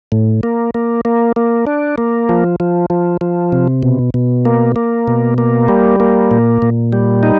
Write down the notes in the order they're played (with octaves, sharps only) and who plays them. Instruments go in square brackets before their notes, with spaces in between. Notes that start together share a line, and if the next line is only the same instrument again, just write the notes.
[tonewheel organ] A2
A#3
A#3
A#3
A#3
D4
A#3
F3
F3
F3
F3
C3
B2
B2
A#3
A#3
B2
A#3
G3
A#3
A#2
A#2
G3
D#4